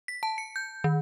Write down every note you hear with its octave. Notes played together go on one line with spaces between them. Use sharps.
B6
A5
C#7
G6
D#3